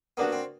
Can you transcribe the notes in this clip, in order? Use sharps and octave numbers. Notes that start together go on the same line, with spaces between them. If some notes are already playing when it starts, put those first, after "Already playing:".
A#3 B3 D4 F#4
C4